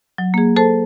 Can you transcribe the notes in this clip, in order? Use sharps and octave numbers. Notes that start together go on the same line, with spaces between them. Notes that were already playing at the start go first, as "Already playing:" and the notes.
F#3
A#3 G#4
A4 C5 A5